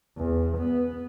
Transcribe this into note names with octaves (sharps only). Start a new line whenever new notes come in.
E2
B3